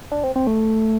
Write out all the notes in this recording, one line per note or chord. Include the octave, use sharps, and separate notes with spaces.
D4
C4
C4
A3